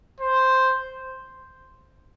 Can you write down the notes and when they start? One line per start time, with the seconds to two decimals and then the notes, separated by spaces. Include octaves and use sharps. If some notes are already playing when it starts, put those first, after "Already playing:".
0.21 C5